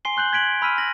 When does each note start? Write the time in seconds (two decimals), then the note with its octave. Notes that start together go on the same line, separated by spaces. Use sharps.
0.05 G#5 C6 C7 G7
0.17 C6 F#6 G6 F#7
0.33 G#6 B6 D7 F#7
0.62 B5 E6 F6 B6 D#7
0.78 E6 A#6 F#7